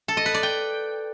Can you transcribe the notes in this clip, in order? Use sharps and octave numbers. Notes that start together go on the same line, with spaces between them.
A4
D#5
B4
D5
G5